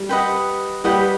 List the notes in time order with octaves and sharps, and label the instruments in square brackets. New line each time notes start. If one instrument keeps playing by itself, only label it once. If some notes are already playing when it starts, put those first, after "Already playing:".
Already playing: [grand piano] G3
[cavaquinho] G4 B4 D#5 F#5
[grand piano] G3 [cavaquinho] G4 B4 D#5 F#5